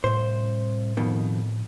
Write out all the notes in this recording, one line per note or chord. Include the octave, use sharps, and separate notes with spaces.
C2 A2 C5
F2 B2 D#3